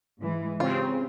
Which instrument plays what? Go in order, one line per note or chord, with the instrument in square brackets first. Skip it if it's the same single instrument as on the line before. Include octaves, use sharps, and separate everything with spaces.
[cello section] G#2 E3 G#3
[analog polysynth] C#3 C4 [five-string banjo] F4 [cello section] G4